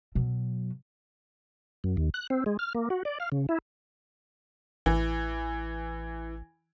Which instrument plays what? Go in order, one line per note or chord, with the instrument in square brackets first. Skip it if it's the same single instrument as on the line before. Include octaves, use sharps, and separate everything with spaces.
[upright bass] B2 F#3
[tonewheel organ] F#2
D#2
F#6
C4
G#3
F6
A#3
F#4
D5
F5
C#3
E4
[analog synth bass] A1 [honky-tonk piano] E3